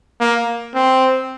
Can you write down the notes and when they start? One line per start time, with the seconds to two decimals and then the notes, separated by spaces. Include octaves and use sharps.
0.20 A#3
0.74 C4